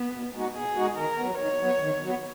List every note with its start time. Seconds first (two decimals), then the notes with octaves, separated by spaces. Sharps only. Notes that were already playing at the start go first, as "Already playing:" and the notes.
Already playing: B3
0.12 B2
0.33 G#3 D#4 F#4
0.55 B2 G#4
0.76 G#3 D#4 F#4
0.96 D#3 A#4
1.17 F#3 B3
1.38 D#3 C#5
1.59 F#3 B3
1.80 D#3
2.01 F#3 B3